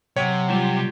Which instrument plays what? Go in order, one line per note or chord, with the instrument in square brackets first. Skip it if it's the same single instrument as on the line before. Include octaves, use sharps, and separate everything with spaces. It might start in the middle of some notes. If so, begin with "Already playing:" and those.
[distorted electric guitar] C3 [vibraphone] F#3 F#5 [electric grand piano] C#5
[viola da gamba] G3 F4